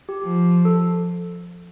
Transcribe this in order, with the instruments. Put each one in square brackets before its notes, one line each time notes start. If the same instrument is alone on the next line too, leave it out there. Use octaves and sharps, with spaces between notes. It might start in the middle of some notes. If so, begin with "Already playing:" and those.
[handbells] G4
[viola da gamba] F3
[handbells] A4